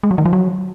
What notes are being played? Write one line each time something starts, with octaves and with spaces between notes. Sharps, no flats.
G#3
F#3
D#3
F3
F#3